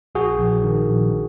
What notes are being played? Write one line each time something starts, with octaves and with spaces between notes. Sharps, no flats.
A#1 F#4 G#4
A#1
D#3
A#1